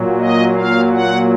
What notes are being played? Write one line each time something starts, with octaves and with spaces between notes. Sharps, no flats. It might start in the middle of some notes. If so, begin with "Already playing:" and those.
Already playing: A#2 F#3
D#5
F5
F#5